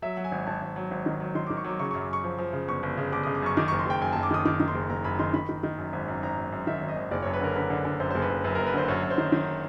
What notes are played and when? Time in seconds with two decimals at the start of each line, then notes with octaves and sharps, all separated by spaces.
0.02 F#3 E5
0.17 F#3
0.24 G#5
0.32 G#1
0.47 G#1 A5
0.62 G#1
0.76 F#3
0.91 G#1
1.06 D#3
1.20 F#3
1.35 D#3 C6
1.47 D#3 D6
1.57 C#6
1.64 F#3 D6
1.79 C#3 C#6
1.91 F#2 C#6
2.01 D6
2.10 F#2 C#6
2.24 F3
2.39 F3
2.53 C#3
2.68 G1 C#6
2.83 G1
2.97 C#3
3.12 G1 D6
3.23 C#3 D#6
3.35 D6
3.42 F#2 C#6
3.57 D#3 D6
3.68 F#1 C#6
3.79 C6
3.86 F#1 G5
4.01 F#2 G#5
4.12 F#1 A5
4.23 D6
4.31 D#3 D#6
4.45 D#3 D6
4.60 D#3
4.68 C6
4.75 F#1
4.90 F#1 A#5
5.04 F#2 B5
5.19 D#3 C6
5.34 D#3 B5
5.49 D#3
5.63 D#3
5.78 F#2
5.93 G#1
6.08 F#2
6.23 G#1 A#5
6.38 F#2
6.52 F#2
6.67 D#3 E5
6.81 G#1
6.89 D#5
6.96 G#1
7.11 F#1 D5
7.22 F#2 C#5
7.33 B4
7.41 D3 A#4
7.56 D3 B4
7.70 D3
7.85 D3
8.00 F#2 C5
8.11 F#1 C5
8.22 B4
8.30 F#1
8.44 F#2 B4
8.55 F#1 A#4
8.67 B4
8.74 D3 C5
8.88 F#2 C#5
9.03 F#2
9.10 C5
9.18 D#3
9.32 D#3